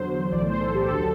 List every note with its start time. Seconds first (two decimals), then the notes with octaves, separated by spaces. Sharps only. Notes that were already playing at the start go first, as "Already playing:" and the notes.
Already playing: E2 D3 F#3 C5
0.32 B1 A2 E3 D5
0.46 C5
0.61 A4
0.75 G4
0.88 D2 D3 F#3 A4